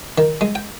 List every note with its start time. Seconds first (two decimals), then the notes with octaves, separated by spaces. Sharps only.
0.18 D#3
0.41 G#3
0.55 G5